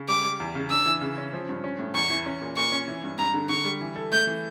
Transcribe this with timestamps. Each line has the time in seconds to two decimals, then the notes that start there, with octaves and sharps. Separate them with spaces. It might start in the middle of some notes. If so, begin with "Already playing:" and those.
Already playing: C#3
0.08 G3 D6
0.24 G3
0.40 E2
0.55 C#3
0.71 D4 E6
0.86 E3
1.01 C#3
1.18 C#4
1.33 F3
1.49 G2
1.64 C#4
1.79 A2
1.94 E2 C#6
2.10 E3
2.26 C#4
2.41 A#2
2.57 A#2 C#6
2.72 C#4
2.88 E3
3.04 G2
3.18 G2 A#5
3.34 D3
3.49 D3 C#6
3.65 G3
3.81 E3
3.96 A4
4.12 A3 G6
4.27 E3